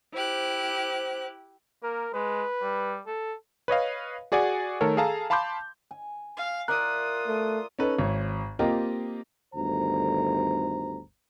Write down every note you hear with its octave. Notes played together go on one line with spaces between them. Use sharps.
E4 G4 C5 F#6
A#3 A#4
G#3 B4
G3
A4
B4 C#5 D#5 F5
F#4 G#4 D5 F#5 G#5
D#3 A3 A4 A#4 C#5
G#4 A4 F5 A5 A#5
F5 A5 B5 C6 D6 G6
G#5
F5
F4 A#4 D5 E5 D#6 F#6
A3
C#4 D#4 A4 B4
G#1 C#5
A#3 C4 F4 G4 A#4 D#5
G1 D2 D#3 C5 A#5